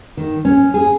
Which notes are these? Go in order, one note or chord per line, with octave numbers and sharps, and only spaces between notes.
D#3
C#4
G#4